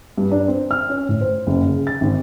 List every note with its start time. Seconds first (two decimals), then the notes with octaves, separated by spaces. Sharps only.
0.18 G2
0.31 D4
0.48 C4
0.71 F6
0.89 C#4
1.09 A2
1.21 C5
1.47 F#1
1.66 C#3
1.87 A6
2.01 G#1